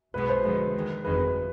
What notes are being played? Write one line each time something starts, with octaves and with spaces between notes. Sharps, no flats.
B1 B2 G#3 B3 B4
C5
D3 F3 G#3 B4
D#2 D#3 G#3
G1 F2 D#3 G#3 B4